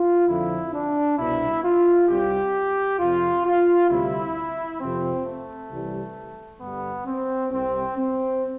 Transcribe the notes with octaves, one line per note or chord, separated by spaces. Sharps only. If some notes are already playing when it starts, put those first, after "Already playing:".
Already playing: F4
F2 D3 F3 E4
D4
C2 B2 G3 E4
F4
C2 C3 G3 G4
F2 C3 F3 F4
F4
D2 C3 G3 E4
F2 C3 F3 C4
A3
C2 C3 E3 G3
G2 D3 G3 B3
C4
C2 C3 G3 C4
C4